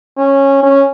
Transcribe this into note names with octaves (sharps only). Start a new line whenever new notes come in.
C#4
C#4